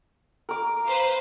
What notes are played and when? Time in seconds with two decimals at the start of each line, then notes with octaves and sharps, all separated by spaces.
0.49 A#4 D6
0.87 B4 C5 F5